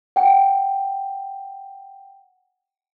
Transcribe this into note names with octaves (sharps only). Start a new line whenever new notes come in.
F#5 G5